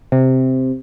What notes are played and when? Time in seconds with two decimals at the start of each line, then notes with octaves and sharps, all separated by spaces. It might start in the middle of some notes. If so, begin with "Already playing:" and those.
0.12 C3